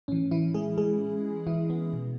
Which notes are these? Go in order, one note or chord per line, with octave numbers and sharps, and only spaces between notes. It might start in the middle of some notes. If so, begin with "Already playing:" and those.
A2 E3 C#4
E3 E4
G#3 G#4
G#3 G#4
E3 E4
B3
B2